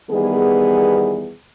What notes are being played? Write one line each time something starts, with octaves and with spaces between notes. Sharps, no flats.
E2 D#3 G3 B3 G#4